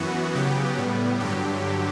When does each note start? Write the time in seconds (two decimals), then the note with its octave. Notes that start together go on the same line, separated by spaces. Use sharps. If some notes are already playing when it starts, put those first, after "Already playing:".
Already playing: F#2 E3 B3 F#4
0.35 C#3 F#3 B3 G4
0.78 A2 G3 B3
1.20 G2 D3 F#3 G4